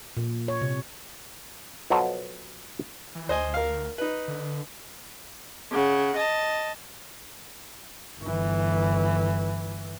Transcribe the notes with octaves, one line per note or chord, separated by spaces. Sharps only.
A#2
C#5
C3
B2 F3 F#3 F#4 A4
E3
D2 C5 D#5 G#5
A#4 F5
D#4 B4
D3
C#3 F#5
D#5 A5
G1 E3